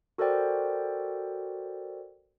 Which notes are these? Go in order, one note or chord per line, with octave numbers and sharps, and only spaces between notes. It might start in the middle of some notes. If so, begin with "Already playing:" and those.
F#4 A4 A#4 C5 D5 G5